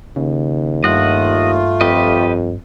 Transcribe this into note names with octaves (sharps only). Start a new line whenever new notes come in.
D#2 C#3
G2 A3 F4 D#5 F#5
F2 G4 B4 D#5